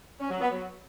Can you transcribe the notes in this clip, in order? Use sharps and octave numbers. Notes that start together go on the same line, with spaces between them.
C#4
F#3
B3
F#3